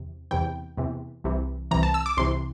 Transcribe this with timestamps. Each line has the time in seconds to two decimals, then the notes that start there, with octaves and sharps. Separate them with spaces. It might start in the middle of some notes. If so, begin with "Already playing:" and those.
Already playing: E2 C3
0.31 E2 C3 E3 G5
0.77 E2 C3 E3
1.24 C2 C3 E3
1.71 C2 C3 E3 A#5
1.83 A5
1.94 E6
2.06 D6
2.17 C2 C3 E3 C6